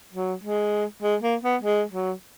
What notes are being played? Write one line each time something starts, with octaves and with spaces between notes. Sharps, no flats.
F#3
G#3
G#3
A#3
B3
G#3
F#3